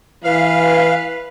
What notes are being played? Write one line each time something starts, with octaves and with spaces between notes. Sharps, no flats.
E3 B4 F5